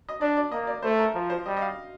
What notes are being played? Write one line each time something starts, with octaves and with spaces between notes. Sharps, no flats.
D#5
D4 D5
D5
A#3 D#5
D5
A3 C5
A#4
F3 A#4
C5
G3 D#5
D#5
F5